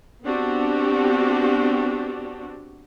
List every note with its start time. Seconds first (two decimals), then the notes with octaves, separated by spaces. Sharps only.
0.23 B3 C4 D4 F#4 G4